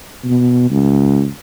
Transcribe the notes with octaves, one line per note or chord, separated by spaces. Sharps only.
B2
C#2